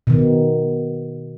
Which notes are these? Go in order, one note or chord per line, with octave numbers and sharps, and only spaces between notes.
B2 D#3